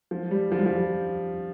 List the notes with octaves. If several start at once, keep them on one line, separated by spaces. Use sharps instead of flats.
F3
G3
F3
G3
F3